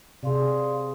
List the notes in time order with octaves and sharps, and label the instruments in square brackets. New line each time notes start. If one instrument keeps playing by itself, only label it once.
[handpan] C3 G#4 [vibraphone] D5 F5 C6